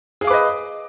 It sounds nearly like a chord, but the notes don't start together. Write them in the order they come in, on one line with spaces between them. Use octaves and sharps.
G#4 F5 D6 B4 D#5